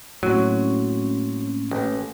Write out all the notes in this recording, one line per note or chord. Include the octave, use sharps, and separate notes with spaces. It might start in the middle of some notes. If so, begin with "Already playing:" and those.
A2 F#3 A#3 C4 C#4
A1